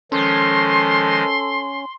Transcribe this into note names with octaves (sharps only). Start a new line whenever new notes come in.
D#3 F3 G#3 C#4 A4 C6